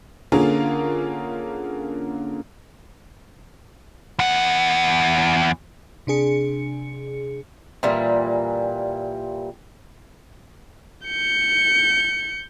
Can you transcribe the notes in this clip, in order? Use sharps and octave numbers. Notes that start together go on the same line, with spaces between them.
D3 A#3 C#4 F4 G#4 A#4
E2 F#5
C3 D4 G#4 C#7
A#2 E3 G3 A#3
G6 C#7